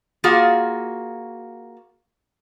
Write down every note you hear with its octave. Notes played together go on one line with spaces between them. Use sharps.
A#3 F4 F#4 G#4